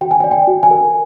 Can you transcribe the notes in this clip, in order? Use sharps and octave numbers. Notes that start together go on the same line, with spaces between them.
F#4 G5
G#5
G5
D5
G5
F#4
G#5
A#4